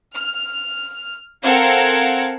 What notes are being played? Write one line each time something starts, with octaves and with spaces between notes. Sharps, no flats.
F6
C4 A4 A#4 F5 F#5 G#6